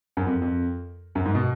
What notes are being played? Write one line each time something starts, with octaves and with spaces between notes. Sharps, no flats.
F#2
F2
F2
F#2
G#2
B2